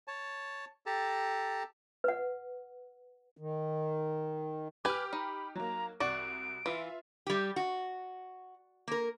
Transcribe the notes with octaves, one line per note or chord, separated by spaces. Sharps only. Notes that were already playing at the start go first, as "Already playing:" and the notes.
C#5 A5
G4 A4 A5 A#5
B4 F#5
D#3
G4 B4 G#5 D6 F6
D#4 B5
F#3 A#3 A#5
C2 F#4 D5 D7
E3 F4 E5
G3 G4
F#4
A#3 A#4